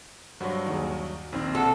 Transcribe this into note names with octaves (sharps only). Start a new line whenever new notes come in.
G2 F#3 F#4 C5 C#5
D#2 G#4
A#1 D#3 C4
F4 A4 F#5